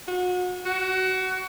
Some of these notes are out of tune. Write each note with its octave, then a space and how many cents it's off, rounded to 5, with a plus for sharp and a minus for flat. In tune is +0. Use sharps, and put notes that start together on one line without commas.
F#4 -35
F#4 +25